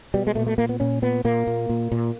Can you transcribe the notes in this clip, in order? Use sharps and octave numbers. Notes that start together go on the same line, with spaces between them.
B2 G3
G#3
A#2 A3
A3
A#2 A#3
B3
A#2 C#4
A#2 B3
A#2 A#3
A#2
A#2
A#2